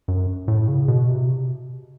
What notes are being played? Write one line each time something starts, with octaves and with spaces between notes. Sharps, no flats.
F#2
A2
C#3
B2
C3